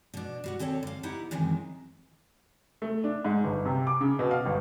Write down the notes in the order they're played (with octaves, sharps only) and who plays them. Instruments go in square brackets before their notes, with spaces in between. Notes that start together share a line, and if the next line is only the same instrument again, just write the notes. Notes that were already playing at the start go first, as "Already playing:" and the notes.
[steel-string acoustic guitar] B2 D4
G3 F#4 F#5
D#2 C4 A4 C#5 A5
D3 F5
B3 D#4 E4 G4 F#5
F#2 C3 D#3 E3 G#3
[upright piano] A3
D4
G#2
G1
C3
D6
C#3
B2
F5
G1